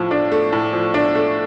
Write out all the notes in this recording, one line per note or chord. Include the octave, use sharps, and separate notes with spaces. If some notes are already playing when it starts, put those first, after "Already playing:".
Already playing: A2 F3
D4
A3
A2
F3
D4
A3